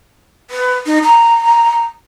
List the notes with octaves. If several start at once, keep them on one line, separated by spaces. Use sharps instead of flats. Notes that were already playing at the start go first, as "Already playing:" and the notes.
B4
D#4
A#5